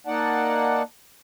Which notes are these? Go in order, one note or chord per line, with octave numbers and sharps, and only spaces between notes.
A#3 D#4 D5 F#5 A5